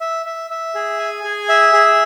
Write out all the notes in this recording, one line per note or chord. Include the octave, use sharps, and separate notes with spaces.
E5
E5
E5
G#4
G#5
G#4
E5
G#4